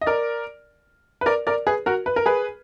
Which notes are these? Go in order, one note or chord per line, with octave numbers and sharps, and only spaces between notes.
D#5
A#4 D5
B4
A#4 D5
A#4 D5
G#4 B4
F#4 A#4
B4
A#4
G#4 B4